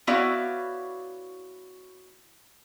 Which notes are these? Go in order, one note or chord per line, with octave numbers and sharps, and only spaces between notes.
B3 E4 F#4 C#5 D5 F5